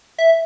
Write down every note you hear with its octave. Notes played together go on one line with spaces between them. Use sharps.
E5